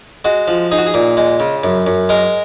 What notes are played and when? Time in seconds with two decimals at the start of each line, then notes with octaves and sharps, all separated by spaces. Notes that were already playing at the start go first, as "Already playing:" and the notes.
0.25 G#3 F#4
0.48 F3
0.71 D#4 G#4
0.78 F#4
0.86 G#4
0.94 A#2
1.17 G#3
1.40 C#3
1.64 F#2
1.87 F#2
2.09 G#3 A#4